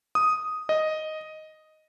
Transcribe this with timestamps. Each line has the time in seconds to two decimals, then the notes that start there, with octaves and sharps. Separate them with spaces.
0.15 D#6
0.69 D#5